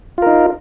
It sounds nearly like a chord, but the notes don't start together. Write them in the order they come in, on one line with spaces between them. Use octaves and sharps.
F4 A#4 D#4